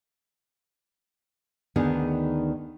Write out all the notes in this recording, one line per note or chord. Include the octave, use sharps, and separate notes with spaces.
D2 D#3 B3 D4 D#4 G#4